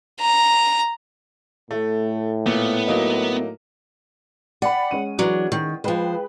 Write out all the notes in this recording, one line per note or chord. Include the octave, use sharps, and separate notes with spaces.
A#5
A2 A3
A#2 B3
F#3 A#3 D#4
D5 F#5 G5 B5
G#3 C#4 D#7
E3 F#3 D4
D#3
F3 G#3 B4 C5 G5